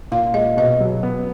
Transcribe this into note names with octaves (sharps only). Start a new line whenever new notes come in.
A#2 F5
G#3 D#5
B2 D#5
F#3
B3